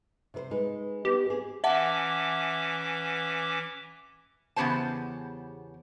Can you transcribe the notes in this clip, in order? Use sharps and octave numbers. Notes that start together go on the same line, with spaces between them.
C3 B4 C5
G#3 D#4 B4
B3 D#4 G4 B4
C4 G#4
E3 C#4 E5 F#5 A5 D6
E2 C#3 B3 G4 C5 A5